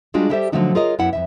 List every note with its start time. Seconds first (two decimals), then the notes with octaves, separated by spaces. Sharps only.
0.14 G3 G#3 D4 F4 F#4 G#4
0.30 G3 E4 G4 A4 C5 E5
0.52 D3 F3 F#3 A3 D4 D#4
0.75 F4 G#4 A#4 C#5 D#5
0.99 F#2 B3 E4 F#5
1.13 F2 B2 E5